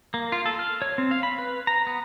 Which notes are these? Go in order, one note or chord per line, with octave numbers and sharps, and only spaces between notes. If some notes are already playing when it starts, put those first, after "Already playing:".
A#3
F4
A4
F6
C#5
C4
F5
B5
B4
A#5
B3